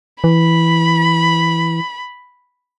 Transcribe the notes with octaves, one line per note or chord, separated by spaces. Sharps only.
E3 B5